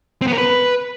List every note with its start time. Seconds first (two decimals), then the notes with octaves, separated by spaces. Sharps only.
0.22 C4
0.27 B3
0.33 A#4
0.38 B4